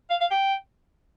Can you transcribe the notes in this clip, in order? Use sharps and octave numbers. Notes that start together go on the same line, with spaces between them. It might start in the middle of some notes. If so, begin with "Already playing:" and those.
F5
F5
G5